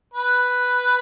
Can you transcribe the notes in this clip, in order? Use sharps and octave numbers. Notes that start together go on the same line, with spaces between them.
B4